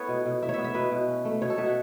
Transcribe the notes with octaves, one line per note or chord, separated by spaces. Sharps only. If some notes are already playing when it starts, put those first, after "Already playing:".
Already playing: B3 E4 A4 B4 C#5
B2
B2
E4 E5
C#5
B3 E5
E5
B2 B4
B2
C#4
A3
B2 C#5
A4
B2 E5
F#5